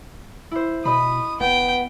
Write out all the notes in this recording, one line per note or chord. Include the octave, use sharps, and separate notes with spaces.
E4 C5
B2 D#5 B5 D#6
F1 B3 G5